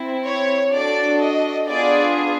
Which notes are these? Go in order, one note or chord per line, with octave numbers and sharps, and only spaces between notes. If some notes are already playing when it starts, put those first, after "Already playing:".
Already playing: C4 E4
C#5
D4 F#4 A4 D5
D#5
B3 D4 F4 G#4 D5